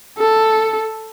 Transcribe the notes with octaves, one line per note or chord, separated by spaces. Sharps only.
A4